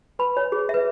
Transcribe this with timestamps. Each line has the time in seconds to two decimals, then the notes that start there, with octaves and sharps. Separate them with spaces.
0.19 B4 B5
0.37 C#5
0.52 G#4
0.69 E5
0.74 B4